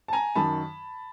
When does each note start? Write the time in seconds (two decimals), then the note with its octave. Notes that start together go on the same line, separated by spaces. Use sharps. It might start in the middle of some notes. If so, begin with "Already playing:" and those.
0.08 A5
0.13 G#5 A#5
0.35 F#2 D#3 F#3 A5 B5